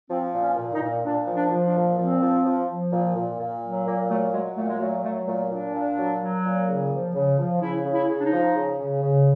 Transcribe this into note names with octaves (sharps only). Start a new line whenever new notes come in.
F3 C4
A#2
C#4
A#2
D#4
A#2
A#2 D4
F3
D4
F3
D4
A#2
F3 C4
F3
F3
F3
A#2
A#2
A#2
F#3
A#2 A#3
F#3 A3
F#3 G#3
A#2 A3
G#3
F#3 A3
F#3 A3
A#2 A3
A#2 D4
A#2
F#3
F#3
A#2
C#3
F3
C#3
F3
C#3 E4
C#3
E4
C#3
D4
D#4
F3
C#3
C#3
C#3